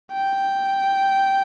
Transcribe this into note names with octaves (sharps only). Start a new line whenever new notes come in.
G5